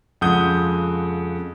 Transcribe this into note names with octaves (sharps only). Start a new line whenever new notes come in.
F2 C#3 G#3 F#5 D#6 G6